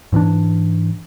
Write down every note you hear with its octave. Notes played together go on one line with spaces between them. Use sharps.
G#2 E3 C4 D4